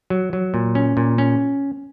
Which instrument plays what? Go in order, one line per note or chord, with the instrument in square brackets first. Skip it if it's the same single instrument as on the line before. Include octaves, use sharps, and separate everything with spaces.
[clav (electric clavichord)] F#3
F#3
A#2
C#4
A#2
C#4